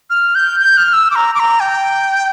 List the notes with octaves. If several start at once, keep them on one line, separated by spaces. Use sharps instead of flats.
F6
G6
G6
F6
E6
D6
A#5
D6
A#5
G5